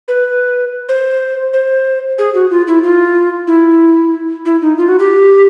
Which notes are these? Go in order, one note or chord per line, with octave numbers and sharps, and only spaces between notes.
B4
C5
C5
G#4
F#4
F4
E4
F4
E4
E4
D#4
F4
F#4
G4